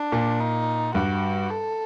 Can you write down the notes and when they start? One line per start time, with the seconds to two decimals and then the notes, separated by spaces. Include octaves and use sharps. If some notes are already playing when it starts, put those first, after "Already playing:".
Already playing: D4
0.12 A#2
0.40 D#4
0.94 G2 F#4
1.50 A4